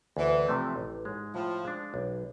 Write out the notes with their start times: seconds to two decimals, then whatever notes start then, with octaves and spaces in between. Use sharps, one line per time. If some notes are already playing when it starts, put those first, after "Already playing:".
0.17 D2 E3
0.46 C3 F3 A3 C4
0.76 A1
1.05 G#2 G#3
1.35 A2 F3
1.65 G#3 D4
1.94 B1